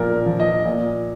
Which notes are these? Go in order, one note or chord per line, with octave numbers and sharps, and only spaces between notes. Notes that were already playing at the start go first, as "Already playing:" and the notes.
Already playing: A#2 F3 A#4
F3
D#5
A#2